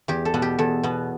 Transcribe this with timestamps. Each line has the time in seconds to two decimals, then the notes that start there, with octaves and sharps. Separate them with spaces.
0.08 E2 G4
0.25 A4
0.34 B2 B3
0.42 G4
0.59 E2 A4
0.83 B2 B3